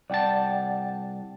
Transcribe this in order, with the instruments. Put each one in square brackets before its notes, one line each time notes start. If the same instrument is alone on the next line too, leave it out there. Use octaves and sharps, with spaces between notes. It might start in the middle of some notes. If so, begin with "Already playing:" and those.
[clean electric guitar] C2 A5 [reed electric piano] D5 F#5 G5